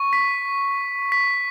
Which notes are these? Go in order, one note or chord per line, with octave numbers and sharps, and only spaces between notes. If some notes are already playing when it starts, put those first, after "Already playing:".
Already playing: C#6
B6
B6